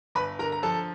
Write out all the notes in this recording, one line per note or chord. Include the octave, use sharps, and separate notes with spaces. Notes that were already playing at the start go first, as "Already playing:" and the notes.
G1 B4 B5
D3 A#4 A#5
A#5
F3 A4 A5